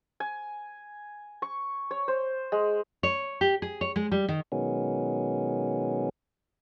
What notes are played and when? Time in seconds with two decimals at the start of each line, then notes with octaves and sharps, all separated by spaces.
0.20 G#5
1.42 C#6
1.91 C#5
2.08 C5
2.52 G#3
3.03 C#5
3.41 G4
3.62 G#4
3.81 C#5
3.96 G#3
4.12 G3
4.29 D#3
4.52 B2 D#3 F#3 G#3 B3 C#4